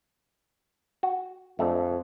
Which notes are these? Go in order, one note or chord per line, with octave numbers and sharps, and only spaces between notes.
F#4
F2 G#3 A3 D4